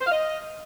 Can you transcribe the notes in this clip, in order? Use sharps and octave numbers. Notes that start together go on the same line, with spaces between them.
C5
F5
D#5